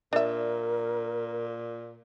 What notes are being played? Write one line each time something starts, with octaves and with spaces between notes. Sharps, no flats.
A#2 D4 A#4 E5